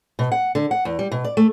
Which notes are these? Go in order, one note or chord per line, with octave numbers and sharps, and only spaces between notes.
B2
F#5
D3
F#5
E2
G3
B2
D5
A3